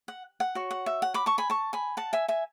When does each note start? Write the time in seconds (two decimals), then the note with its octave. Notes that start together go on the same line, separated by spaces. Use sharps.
0.08 F#5
0.40 F#5
0.55 F#4 C#5
0.71 F#5
0.86 E5
1.02 F#5
1.14 B5 D6
1.26 A5 C#6
1.38 G#5 B5
1.50 A5 C#6
1.73 G#5 B5
1.97 F#5 A5
2.13 E5 G#5
2.28 E5 G#5